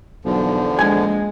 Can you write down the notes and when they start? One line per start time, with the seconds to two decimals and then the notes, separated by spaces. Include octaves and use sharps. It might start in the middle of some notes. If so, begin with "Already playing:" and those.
0.25 B1 E2 D3 F3
0.79 A#1 G#3 G#5